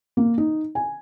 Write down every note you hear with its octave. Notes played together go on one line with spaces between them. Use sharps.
A#3
D#4
G#5